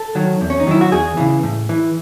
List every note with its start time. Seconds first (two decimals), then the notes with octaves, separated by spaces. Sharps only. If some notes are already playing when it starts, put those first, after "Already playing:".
Already playing: A4
0.15 D#3 F#3
0.41 E2
0.50 C#4
0.60 D#4
0.67 D#3 F#3 E4
0.81 F#4
0.91 E2 G#4
1.17 C#3 E3
1.43 A2
1.69 E3